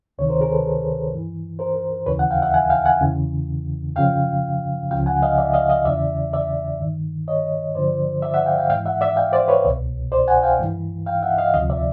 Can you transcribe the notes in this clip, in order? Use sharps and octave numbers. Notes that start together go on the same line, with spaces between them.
D2 C3 D#3 C#5
A#4 C5
G#4 A#4
A4 B4
G2 E3
A#4 C5
D#2 C#3 E3 B4 C#5
F#5
F5 G5
E5 F#5
F#5 G#5
F5 G5
F#5 G#5
E2 C#3 E3
F#2 C#3 F3 F5 G5
C#2 C#3 F3 F5 G5
F#5 G#5
D#5 F5
D5 E5
D#5 F5
D#5 F5
E2 C#3 E3 D5 E5
D5 E5
G2 D#3
C#5 D#5
G2 D3 F3 C5 D5
D5 E5
E5 F#5
F5 G5
F5 G5
G#2 E3 F5 G5
E5 F#5
D5 E5
F5 G5
C5 D5
B4 C#5
C2 B2
C5 D5
F#5 G#5
F5 G5
G2 E3
F5 G5
E5 F#5
D#5 F5
D2 C3 F3 D#5 F5
D5 E5